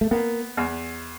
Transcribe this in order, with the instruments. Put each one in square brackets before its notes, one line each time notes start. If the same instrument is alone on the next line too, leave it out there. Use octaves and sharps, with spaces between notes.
[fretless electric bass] A3
[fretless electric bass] A#3 [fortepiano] B3
[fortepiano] E2